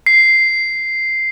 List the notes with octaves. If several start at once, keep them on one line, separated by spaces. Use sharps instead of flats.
C7